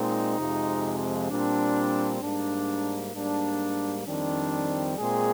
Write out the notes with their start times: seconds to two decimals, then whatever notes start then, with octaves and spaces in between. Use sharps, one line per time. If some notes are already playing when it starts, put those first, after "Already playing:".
Already playing: A#2 G#3 C4 D#4
0.39 F2 C3 F3 G#3
1.30 A#2 G3 C4 D4
2.22 G#2 G3 A#3 D4
3.14 G#2 G3 A#3 D4
4.06 F2 D#3 G3 C4 D4
4.98 A#2 G#3 C4 G#4